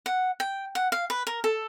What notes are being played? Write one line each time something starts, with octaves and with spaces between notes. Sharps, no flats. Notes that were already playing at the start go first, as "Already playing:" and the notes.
F#5
G5
F#5
F5
B4
A#4
A4